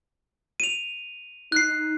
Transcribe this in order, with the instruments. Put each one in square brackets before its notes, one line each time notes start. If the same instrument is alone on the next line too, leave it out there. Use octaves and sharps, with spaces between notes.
[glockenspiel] D#7 F7
[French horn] D#4 [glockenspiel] F#6 C7